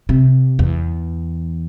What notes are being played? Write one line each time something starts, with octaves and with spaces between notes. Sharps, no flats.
C3
E2